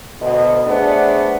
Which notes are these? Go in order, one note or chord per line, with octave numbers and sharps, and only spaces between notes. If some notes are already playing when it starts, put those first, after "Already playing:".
D2 B2 D#5
A3 B3 D4 G#4 C5 D5